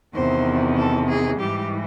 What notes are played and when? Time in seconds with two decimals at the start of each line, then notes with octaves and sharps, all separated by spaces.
0.14 E2 C3 D#3 C5
0.75 A4
1.07 G#4
1.38 G#2 E3 G3 G4